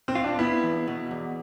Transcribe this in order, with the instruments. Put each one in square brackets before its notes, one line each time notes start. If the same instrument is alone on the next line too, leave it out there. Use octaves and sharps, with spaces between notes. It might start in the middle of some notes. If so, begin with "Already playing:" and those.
[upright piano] C4
[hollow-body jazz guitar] F4
[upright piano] D4
[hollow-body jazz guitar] B3 [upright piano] E4
[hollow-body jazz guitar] E2
B2
E2